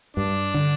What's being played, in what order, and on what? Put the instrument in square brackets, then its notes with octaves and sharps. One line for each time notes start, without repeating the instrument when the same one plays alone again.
[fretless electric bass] G2 [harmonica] D4
[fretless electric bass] D3